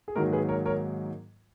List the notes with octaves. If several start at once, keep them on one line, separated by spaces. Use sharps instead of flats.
G#4
G#2 D#3 F#3 A#3 F#4 A#4
G#4 B4
A#4 C#5
A#4 C#5